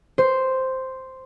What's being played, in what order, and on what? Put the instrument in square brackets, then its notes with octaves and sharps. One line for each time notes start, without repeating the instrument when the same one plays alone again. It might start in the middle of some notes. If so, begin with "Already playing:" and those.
[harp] C5